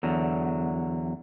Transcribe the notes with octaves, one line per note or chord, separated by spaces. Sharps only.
E2 D3 F#3